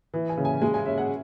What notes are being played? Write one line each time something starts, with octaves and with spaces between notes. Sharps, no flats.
E3
G#5
C#3
G#5
G#3 G#5
G#5
C#4 E5
F#5